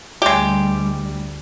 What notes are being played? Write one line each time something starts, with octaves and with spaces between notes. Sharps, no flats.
D2 G3 G#3 G4